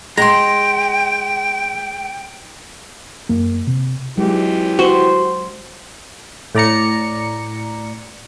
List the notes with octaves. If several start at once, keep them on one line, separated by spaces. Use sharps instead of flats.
G#3 G5 A#5 C6
F#2 A#3
C3
E3 F#3 G#3 G4
F#4 C5
A2 D5 A#5 C#7